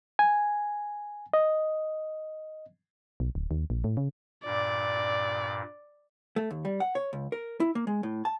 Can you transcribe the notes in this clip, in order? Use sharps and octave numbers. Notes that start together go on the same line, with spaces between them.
G#5
D#5
B1
D1
D#2
A#1
A2
C#3
G2 A#2 D5
A3
D#2
G3
F#5
C#5
C#2
A#4
E4
A#3
G#3
A2
A5